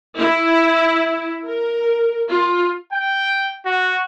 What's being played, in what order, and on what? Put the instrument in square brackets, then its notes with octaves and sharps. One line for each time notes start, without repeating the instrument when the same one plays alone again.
[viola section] E4
A#4
F4
[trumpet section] G5
F#4